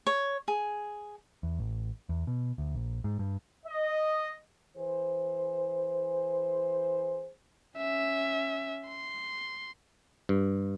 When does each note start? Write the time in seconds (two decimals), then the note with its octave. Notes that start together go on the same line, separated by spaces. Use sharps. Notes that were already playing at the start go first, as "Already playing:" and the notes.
0.07 C#5
0.48 G#4
1.43 E2
1.59 A1
2.09 E2
2.27 B2
2.58 D2
2.75 A#1
3.04 G#2
3.19 G2
3.65 D#5
4.77 E3 G#4 C5
7.77 C#4 E5
8.87 C6
10.29 G2